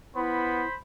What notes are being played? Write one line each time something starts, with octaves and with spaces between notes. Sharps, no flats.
B3 E4 C5 B5